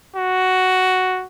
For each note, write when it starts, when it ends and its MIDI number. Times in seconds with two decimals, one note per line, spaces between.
0.16 1.26 66